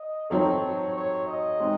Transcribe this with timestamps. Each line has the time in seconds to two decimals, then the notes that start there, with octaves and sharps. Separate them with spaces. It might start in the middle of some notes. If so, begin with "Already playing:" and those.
Already playing: D#5
0.29 F#3 C4 D#4 A4 C#5
0.95 C#5
1.27 D#5
1.60 G#3 C4 D#4